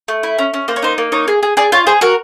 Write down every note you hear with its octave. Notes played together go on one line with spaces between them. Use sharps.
A3
E4
C#4
C#4
A#3 C5
C#5
D#4 C5
A#3
D#4 C#5
G#4
G#4
G#4 D5
F4 C#5
G#4 C5
F#4 A#4